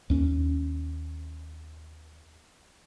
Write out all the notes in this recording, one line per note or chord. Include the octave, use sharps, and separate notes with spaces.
D#2 C#4